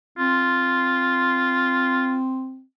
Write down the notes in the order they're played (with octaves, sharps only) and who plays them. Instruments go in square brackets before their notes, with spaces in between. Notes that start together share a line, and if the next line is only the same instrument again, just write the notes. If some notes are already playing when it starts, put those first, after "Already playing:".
[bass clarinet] C4 [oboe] F4